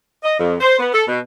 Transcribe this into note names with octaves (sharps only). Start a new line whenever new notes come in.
D#5
F2
C5
B3
A4
B2